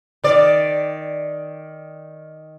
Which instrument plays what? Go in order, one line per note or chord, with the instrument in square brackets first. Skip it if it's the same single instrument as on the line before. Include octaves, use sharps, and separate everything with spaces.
[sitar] D#3 D5